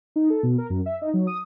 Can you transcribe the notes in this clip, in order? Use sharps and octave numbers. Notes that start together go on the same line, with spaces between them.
D#4
A4
B2
A#4
F#2
E5
D#4
F#3
D#6